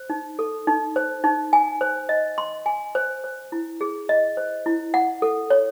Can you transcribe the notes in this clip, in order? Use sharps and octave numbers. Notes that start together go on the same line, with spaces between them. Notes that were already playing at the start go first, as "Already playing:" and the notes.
Already playing: C5
D#4
A4
D#4
C5
D#4
G#5
C5
D#5
C6
G#5
C5
C5
E4
G#4
D#5
C5
E4
F#5
A4
C#5